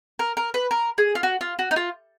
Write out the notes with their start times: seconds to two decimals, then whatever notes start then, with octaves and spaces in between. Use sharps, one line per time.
0.19 A#4
0.37 A#4
0.54 B4
0.71 A#4
0.98 G#4
1.15 F4
1.23 F#4
1.41 F4
1.59 F#4
1.71 D#4
1.76 F4